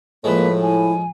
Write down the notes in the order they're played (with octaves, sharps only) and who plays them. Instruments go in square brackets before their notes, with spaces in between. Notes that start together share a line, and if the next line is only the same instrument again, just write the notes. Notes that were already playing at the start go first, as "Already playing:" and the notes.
[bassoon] A2 [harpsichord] F3 G#3 [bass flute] A#3 [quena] B4
[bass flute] E4 [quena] G#5